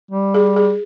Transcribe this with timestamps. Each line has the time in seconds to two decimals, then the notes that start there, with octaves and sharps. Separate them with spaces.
0.11 G3
0.34 G#4
0.56 G#4